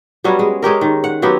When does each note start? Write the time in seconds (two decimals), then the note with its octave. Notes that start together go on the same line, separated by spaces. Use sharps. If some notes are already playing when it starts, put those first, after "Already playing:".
0.24 F#3 G3 B3 C#4
0.39 G#3
0.62 G#3 C#4 G4 A#4
0.81 D#3
1.04 F#5
1.22 F#3 B3 C4 G4